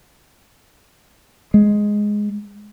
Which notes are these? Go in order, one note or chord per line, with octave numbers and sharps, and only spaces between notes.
G#3